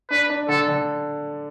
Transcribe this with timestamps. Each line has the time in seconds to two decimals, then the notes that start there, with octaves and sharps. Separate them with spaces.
0.10 D4 B4
0.30 D4
0.49 D3 A4
0.68 D3